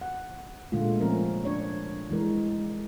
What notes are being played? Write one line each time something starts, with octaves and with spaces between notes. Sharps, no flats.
F#5
A#2 D3 G#3 A3 F4
F3 C4 C#4 A#4
D4 C#5
E3 G#3 A#4